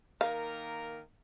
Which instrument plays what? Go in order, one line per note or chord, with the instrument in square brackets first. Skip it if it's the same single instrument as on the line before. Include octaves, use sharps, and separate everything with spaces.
[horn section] D#3 A#3 A#4 [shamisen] F5